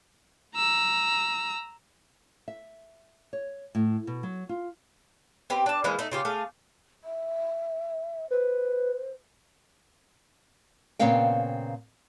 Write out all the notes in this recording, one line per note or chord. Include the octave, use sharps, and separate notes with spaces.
A#5 E6
E5
C#5
A2
B2
F#3
F4
C4 G4 B4
D4 A5
E3 F3 G#3 A#3
A3 D#4
C#3 F4 G4
A3 G#4 F5
E5
B4 C5
A#2 C#3 B3 C4 F5 G5